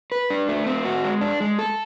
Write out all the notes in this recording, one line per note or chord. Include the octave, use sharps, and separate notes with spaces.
B4
D4
A3
C4
F#4
G#3
D4
G#3
A4